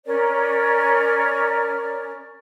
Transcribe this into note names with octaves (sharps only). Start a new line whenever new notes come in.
C#4 A#4 C#5 D5